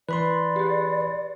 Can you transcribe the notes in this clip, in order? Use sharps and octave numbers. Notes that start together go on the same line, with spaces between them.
E3 B4 D5 B5 C6
G4 G#4